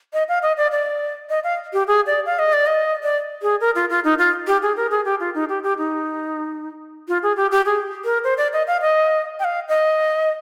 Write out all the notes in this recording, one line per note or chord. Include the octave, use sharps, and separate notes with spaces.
D#5
F5
D#5
D5
D5
D#5
F5
G4
G#4
D5
F5
D#5
D5
D#5
D5
G#4
A#4
F4
F4
D#4
F4
G4
G#4
A#4
G#4
G4
F4
D#4
G4
G4
D#4
F4
G#4
G4
G4
G#4
A#4
C5
D5
D#5
F5
D#5
G5
F5
D#5